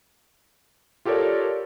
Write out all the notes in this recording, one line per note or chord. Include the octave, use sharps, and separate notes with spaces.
F4 G4 A4 A#4 C#5 D5